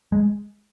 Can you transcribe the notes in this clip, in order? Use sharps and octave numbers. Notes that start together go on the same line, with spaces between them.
G#3